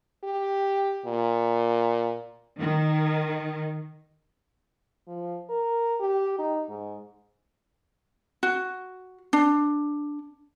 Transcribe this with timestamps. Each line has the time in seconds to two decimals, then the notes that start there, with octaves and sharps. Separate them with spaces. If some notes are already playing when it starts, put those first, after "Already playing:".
0.24 G4
1.05 A#2
2.59 D#3
5.08 F3
5.50 A#4
6.00 G4
6.39 D#4
6.69 G#2
8.43 F#4
9.33 D4